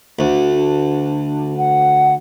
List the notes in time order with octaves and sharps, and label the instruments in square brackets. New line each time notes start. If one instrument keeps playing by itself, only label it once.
[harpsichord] D2
[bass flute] D4
F#5